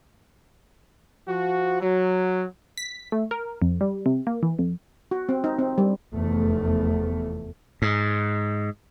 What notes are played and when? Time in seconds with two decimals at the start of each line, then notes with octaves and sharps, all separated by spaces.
1.28 F3 F#4
1.81 F#3
2.78 B6
3.12 A3
3.31 A#4
3.62 F2
3.81 G3
4.06 C3
4.27 A#3
4.43 E3
4.59 F2
5.11 F#4
5.29 C4
5.44 D#4
5.59 C4
5.78 G3
6.13 F1 E2 A3
7.82 G#2